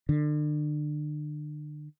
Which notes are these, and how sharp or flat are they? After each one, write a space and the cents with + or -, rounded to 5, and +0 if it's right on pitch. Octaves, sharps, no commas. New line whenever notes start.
D3 +35